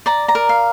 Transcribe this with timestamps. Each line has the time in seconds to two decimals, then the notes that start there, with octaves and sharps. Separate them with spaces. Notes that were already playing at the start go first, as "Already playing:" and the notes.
0.06 D5 A#5
0.28 A#5
0.35 A#4
0.49 F5